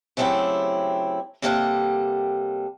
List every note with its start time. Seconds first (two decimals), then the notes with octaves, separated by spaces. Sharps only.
0.17 C#3 F#3 A3 C4 E4 G4
1.42 C3 G3 A#3 A4 C#5 F#5